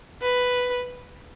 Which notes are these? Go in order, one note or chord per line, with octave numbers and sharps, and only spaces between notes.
B4